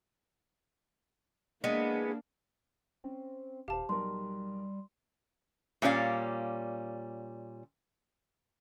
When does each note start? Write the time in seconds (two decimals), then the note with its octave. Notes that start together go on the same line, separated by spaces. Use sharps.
1.64 E3 G#3 A#3 B3 D4
3.04 C4 C#4
3.68 D#1 G4 C5 F5 A5
3.89 B1 G3 A#4 C6
5.82 A#2 G3 C#4 D#4 D5 F5